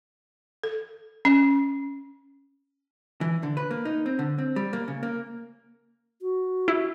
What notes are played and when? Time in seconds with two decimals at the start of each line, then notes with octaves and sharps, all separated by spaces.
0.64 A4
1.25 C#4
3.21 E3
3.43 D3
3.57 B4
3.71 A#3
3.85 D#4
4.06 C4
4.19 D3
4.38 C4
4.56 G3
4.73 A#3
4.88 C#3
5.03 A#3
6.22 F#4
6.68 E4